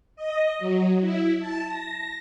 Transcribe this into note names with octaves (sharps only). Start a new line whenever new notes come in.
D#5
F#3
E4
A5
A#6